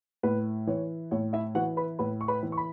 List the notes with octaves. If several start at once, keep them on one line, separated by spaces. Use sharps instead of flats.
A2 B4
E3 C#5
A2 C#5
E4 E5
E3 F#4 F#5
B4 B5
A2 B4 B5
C#6
B4 B5
E3
C#6
B5